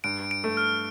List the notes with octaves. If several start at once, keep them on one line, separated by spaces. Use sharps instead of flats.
G2 D7
D7
A3
F6